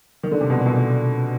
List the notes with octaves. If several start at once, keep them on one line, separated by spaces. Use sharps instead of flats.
D#3
D3
C3
B2
A#2
B2
A#2